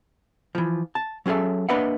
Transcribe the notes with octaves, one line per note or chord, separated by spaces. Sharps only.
E3 F3
A5
F#3 C#4 G#4 A4 E5
A#3 D4 B4 D#5 E5 F#5